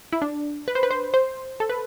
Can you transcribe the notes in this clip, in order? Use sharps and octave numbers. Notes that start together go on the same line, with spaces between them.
E4
D4
B4
C5
B4
C5
C5
A4
B4